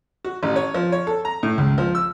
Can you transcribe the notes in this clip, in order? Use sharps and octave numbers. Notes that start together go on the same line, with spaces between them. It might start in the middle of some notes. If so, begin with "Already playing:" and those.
F#4
A1
C#5
F3
C#5
A4
A#5
A2
C#2
F3
E6